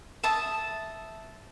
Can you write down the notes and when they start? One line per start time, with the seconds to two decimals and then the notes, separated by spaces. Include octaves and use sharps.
0.23 E5 A5 D#6